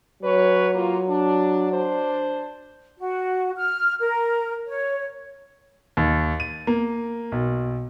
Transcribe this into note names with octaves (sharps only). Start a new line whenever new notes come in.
F#3 C#4 B4 C#5
A#3 F4
D4
D4 C5
F#4
F6
A#4
C#5
D#2
D#7
A#3
B1